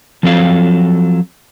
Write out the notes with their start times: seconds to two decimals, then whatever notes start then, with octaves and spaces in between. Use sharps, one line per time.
0.23 F3 F#3 C4 A4 E5 F5